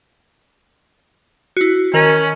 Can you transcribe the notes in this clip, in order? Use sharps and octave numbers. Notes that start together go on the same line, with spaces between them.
E4 F#4
D#3 C#4 A#4 F#7